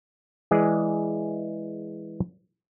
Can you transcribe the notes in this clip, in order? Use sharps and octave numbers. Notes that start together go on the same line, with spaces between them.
E3 G#3 G#4 D5